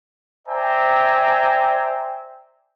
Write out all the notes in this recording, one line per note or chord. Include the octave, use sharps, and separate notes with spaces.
C5 D5 E5 G5 G#5 A#5